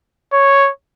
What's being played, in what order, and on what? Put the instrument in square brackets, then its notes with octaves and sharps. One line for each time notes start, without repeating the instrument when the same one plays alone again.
[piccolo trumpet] C#5